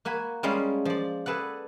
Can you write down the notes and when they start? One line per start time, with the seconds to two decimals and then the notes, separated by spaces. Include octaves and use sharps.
0.05 A#3 F#4 G#5 B5
0.43 G3 G#3 C#4 F4 C#5
0.85 F3 D5
1.26 G#4 A4 B4 D5 F#5